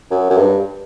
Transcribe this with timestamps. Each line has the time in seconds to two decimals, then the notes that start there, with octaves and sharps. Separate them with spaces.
0.11 F#2
0.30 F#2
0.37 G2